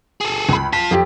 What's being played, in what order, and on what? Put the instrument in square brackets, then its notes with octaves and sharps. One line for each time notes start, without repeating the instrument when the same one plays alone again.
[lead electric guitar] G#4 A4
[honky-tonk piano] C#2 B5
[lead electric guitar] F4 A5 [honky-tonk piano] B6
[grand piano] F2 G4